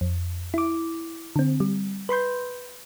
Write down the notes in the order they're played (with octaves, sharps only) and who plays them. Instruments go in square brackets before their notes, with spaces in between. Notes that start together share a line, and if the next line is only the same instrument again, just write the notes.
[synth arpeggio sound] F2
E4 D6
D3 C4
G3
B4 B5 C6 G6